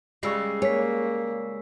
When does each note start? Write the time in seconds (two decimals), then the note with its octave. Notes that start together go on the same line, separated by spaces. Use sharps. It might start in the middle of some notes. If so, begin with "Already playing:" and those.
0.23 C#3 G3 G#3 C#6 E6 C7
0.62 A#3 C#5 G#5 B6